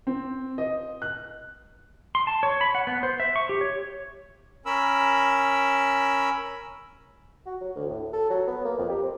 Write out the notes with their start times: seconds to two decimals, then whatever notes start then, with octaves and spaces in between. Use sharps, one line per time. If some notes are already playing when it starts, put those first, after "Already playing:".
0.07 C4
0.58 D#5
1.02 F#6
2.15 C6
2.27 A5
2.43 C#5
2.61 B5
2.75 F#5
2.87 B3
3.03 C5
3.20 E5
3.36 C#6
3.49 G4
3.61 C#5
4.66 C#4 A#4 B5 E6
7.46 F#4
7.61 F#3
7.76 D2
7.89 A2
8.13 A4
8.30 F#3
8.48 B3
8.65 A#3
8.78 F2
8.89 G4
9.03 C4